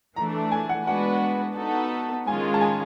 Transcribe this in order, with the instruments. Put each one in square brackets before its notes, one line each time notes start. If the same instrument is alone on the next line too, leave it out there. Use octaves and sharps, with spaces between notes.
[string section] E3 A3 D4 [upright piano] A#5
[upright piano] G#5
F#5
[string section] G#3 B3 D4 F#4 B4 [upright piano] F#5
[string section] B3 D#4 F#4 A4
[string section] D#3 G#3 C#4 F4 [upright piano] G#5
[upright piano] A5
G#5